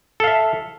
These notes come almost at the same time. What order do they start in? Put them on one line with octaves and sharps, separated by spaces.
A4 F5 E5